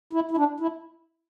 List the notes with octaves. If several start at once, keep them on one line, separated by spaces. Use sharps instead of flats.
E4
E4
D4
E4